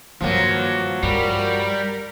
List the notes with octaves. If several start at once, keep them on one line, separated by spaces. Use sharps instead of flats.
G2 D#3 F3 F#3 A#3 F4
G2 G3 A#4